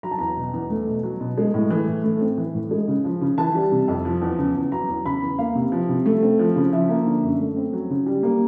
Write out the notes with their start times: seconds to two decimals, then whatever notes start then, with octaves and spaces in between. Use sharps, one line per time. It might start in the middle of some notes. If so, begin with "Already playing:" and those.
0.03 F#3 A#5
0.11 A5
0.18 E2 A#5
0.37 B2
0.53 E2
0.70 A3
0.87 B2
1.03 F#3
1.21 B2
1.38 G#3
1.54 A2
1.70 E3
1.88 A2
2.04 A3
2.21 C4
2.38 E3
2.55 A2
2.71 G#3
2.88 C#3
3.04 F3
3.21 C#3
3.38 E3 A5
3.55 G3
3.72 C3
3.88 F2
4.05 F3
4.22 E2
4.38 C#3
4.55 E2
4.72 F#3 A#5
4.89 E2
5.05 C#3 B5
5.22 E2
5.39 A#3 F5
5.55 C3
5.72 F3
5.89 C3
6.06 A3
6.23 C4
6.39 F3
6.56 C#3
6.72 F3 E5
6.89 A#3
7.06 D3
7.23 F#2
7.40 A3
7.56 C4
7.73 F#3
7.90 C#3
8.06 G3
8.23 A#3